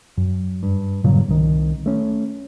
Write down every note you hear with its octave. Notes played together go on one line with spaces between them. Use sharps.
F#2
G2
G2 A#2 C#3 F#3
C2 D#3
A3 C#4